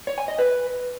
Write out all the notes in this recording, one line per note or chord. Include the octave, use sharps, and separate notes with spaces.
C#5
G#5
D#5
B4